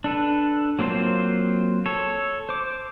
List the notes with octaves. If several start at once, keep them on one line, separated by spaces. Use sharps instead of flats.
D4 A4 B4
F#3 A#3 C4 F4 C5
A4 C#5
C5 D6